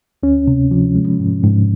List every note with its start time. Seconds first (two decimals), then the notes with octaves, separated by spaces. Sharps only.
0.23 D2 C#4
0.47 C3
0.71 F3
0.95 G#3
1.20 G#2
1.44 G#2